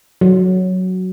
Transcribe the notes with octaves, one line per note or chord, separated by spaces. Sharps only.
F#3